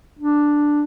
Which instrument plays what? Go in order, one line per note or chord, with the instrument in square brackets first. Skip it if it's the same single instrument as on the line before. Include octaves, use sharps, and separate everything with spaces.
[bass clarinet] D4